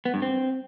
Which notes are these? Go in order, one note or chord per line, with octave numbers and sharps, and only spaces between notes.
B3
G2
C4